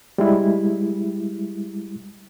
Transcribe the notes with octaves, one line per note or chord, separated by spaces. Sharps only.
G3 G#3 E4